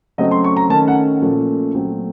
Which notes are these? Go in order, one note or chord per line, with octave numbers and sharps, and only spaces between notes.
C#3 F#3 A3 C4 D#5
C6
C#6
A#5
D#3 A3 C#4 A5
F#5
A#2 F3 A3 C#4
A#2 F#3 A3 C4